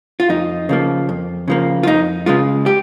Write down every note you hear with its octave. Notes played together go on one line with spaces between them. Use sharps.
F4
F2 D#4
C#3 F3 A#3
F2
C#3 F3 A#3
F4
F2 D#4
C#3 G#3 F4
G4